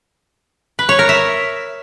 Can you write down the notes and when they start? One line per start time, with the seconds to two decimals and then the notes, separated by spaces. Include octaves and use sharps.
0.79 B4
0.89 C#5
0.99 A#4
1.09 E5